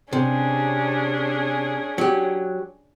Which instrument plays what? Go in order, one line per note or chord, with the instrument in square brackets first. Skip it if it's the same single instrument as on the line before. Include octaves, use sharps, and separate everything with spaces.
[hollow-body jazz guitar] C3 [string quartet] C#4 D4 G#4
[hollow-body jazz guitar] F#3 G4